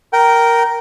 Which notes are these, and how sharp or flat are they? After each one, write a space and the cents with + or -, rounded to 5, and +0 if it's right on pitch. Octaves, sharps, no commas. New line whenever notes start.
A#4 +0 G5 -20